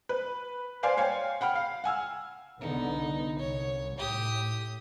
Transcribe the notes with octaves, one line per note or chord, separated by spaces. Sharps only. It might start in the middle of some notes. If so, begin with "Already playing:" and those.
B4
B4 C5 D5 F5 G#5 C6
C#5 F5 G5 G#5
F#5 G5 B5 F6
F5
F#5 G#5 E6 F6
C2 D3 B3 D#4
C2 C#5
A2 G4 D#6